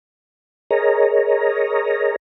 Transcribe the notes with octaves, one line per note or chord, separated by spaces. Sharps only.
G#4 A#4 C#5 D#5 A#5